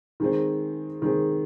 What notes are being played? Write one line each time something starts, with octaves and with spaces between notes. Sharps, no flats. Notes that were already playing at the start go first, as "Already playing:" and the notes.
D#3 G#3 C4
D#3 G#3 C4